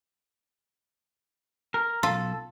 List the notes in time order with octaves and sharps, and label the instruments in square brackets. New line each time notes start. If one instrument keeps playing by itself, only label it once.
[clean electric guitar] A#4
[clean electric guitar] B1 A4 [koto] F4